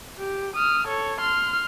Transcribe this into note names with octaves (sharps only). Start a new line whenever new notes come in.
G4
D#6 F6
A4 C#5
C6 F6